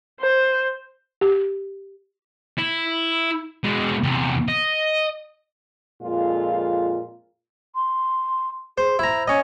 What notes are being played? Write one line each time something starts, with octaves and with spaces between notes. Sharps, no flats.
C5
G4
E4
B2 G#3
E2 C3
D#5
F2 A#2 G#3 F4
C6
G#4 C5
E4 C5 A#5
C#4 D#5